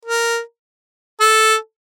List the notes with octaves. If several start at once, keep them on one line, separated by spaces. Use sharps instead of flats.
A#4
A4